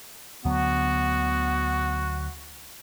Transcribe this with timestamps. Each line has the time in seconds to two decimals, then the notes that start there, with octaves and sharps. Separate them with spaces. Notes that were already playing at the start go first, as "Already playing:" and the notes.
0.45 D2 D3 F#3 B3 F#4